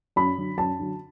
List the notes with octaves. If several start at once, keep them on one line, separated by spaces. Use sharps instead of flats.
F#2 B5
D3 F#3
F#2 A5
D3 F#3